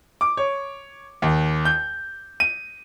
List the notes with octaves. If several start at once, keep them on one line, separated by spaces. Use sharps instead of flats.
D6
C#5
D#2
G6
D#7